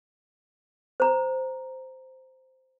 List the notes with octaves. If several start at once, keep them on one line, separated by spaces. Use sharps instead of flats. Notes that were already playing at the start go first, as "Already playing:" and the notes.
C5 A#5